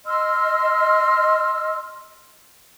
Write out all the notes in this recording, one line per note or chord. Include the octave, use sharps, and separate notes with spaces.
D#5 C6 E6 F6